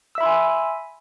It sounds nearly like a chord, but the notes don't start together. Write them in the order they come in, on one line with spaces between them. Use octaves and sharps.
E6 E5 B5 C6 G#5